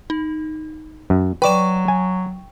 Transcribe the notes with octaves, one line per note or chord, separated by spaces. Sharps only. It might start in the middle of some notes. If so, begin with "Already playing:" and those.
D#4
F#2
F#3 B4 D5 G5 C#6 E7
G#5